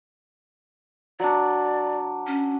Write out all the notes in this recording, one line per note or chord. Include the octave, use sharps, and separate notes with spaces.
F#3 D4 D5
C#4